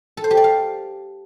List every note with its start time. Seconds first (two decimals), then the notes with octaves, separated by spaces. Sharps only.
0.17 A4
0.24 C5
0.31 G4
0.37 D5
0.44 F5